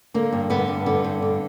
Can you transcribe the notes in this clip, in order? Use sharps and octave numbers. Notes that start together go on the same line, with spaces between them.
D3 A#3
G2
D3 B3
G2
D3 B3
G2
D3